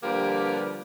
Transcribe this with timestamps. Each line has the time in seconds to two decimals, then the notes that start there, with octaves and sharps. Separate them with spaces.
0.03 D3 F3 G3 A#3 G4 B4